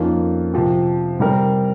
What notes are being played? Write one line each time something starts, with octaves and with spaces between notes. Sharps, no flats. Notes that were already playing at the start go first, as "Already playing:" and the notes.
Already playing: F2 D#3 A#3 C#4 F4
C3 F3 C4
C3 G3 C4 G4 A#4